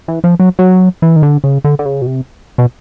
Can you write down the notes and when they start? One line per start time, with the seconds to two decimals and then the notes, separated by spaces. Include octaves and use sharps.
0.08 E3
0.24 F3
0.40 F#3
0.59 F#3
1.02 E3
1.16 D#3
1.23 D3
1.44 C#3
1.64 D3
1.79 D3
1.85 C#3
2.02 B2
2.06 C3
2.58 B2